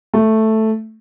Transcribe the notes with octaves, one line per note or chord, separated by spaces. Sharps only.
A3